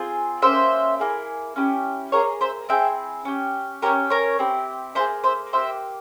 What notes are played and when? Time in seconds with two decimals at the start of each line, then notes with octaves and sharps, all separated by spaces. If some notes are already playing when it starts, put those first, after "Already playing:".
Already playing: C4 F4 G#4
0.42 A#3 C#4 G4 C5 E5
1.00 A#3 E4 G#4
1.56 C#4 E4 G4
2.12 A#3 F4 G#4 A#4 C#5
2.41 C5 E5
2.69 C4 E4 G#4 E5 G5
3.25 C#4 G4
3.82 C#4 G4 A#4 C#5
4.10 A#4 C#5
4.39 C4 E4 G4
4.95 A#3 F4 G#4 C5 E5
5.24 C5 E5
5.53 C#4 G4 C5 E5
5.57 A#3